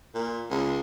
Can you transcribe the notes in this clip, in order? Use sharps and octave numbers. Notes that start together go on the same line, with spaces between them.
A#2
C#2